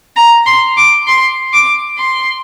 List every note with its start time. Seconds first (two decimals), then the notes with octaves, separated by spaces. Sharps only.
0.16 A#5
0.46 C6
0.77 D6
1.07 C6
1.53 D6
1.98 C6